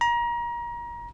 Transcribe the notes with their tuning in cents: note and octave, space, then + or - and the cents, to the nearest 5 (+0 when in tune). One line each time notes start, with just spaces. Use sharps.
A#5 +30